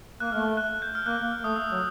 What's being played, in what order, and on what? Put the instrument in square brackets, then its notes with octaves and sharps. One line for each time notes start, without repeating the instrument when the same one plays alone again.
[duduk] A#3 [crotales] F#6
[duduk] A3 [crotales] F6
[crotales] F#6
G6
F6
[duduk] A#3 [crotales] F#6
[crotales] F6
[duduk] A3 [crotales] D#6
[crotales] E6
[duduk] F#3